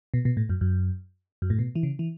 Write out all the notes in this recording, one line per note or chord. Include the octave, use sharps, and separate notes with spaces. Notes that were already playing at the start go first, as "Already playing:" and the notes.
B2
B2
A2
F#2
F#2
F#2
A2
B2
E3
C#3
E3